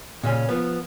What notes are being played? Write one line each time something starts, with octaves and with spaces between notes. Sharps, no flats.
A#2 C#3 C#4
F3 B3